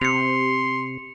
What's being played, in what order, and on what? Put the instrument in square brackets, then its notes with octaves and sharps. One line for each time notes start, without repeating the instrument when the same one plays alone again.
[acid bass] C3 [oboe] C6 [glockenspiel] C#7 F7